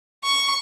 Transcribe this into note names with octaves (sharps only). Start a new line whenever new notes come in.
C#6